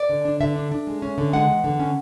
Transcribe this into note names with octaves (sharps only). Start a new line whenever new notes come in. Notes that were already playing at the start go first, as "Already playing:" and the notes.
Already playing: D5
D3
D4
D3 E5
D4
D4
G#3
C#4
D3
G#3 F#5
E2
D3
C#4